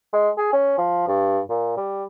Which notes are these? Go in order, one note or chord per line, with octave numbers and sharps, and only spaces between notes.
G#3
G#4
C#4
F3
G2
A#2
G3